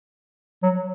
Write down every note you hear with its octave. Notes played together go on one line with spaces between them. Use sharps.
F#3